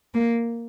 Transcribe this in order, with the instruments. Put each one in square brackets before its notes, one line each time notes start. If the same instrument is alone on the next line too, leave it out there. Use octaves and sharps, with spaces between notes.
[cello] A#3